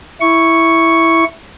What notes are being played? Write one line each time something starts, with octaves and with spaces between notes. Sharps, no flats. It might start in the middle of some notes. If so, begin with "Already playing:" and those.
E4 C#6